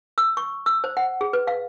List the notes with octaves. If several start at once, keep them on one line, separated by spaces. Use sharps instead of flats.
E6
C#6
E6
C5
F#5
G#4
B4
F5